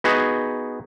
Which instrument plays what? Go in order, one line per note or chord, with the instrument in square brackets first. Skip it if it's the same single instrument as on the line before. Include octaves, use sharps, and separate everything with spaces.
[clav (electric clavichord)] B3 D#4 F#4 G#4